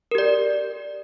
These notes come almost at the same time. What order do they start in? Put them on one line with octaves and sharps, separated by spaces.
A#4 G4 D5